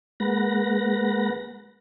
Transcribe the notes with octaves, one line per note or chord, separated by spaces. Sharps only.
G#3 A#3 B4 F#5 A#6